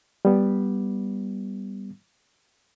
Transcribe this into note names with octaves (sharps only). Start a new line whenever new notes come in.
G3 B3